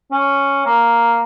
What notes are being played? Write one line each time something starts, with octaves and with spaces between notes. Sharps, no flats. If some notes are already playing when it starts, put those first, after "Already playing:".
C#4
A#3